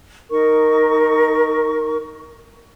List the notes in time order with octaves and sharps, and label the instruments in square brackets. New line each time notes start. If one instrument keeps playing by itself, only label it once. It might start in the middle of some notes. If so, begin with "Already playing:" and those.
[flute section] D#4 A#4 C#6